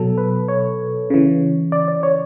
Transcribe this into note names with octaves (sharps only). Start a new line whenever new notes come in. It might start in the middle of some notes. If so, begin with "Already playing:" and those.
Already playing: B2 F#3 A4
B4
C#5
C#3 E3
D5
D5
C#5